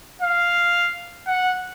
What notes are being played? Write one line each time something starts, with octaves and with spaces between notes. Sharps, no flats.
F5
F#5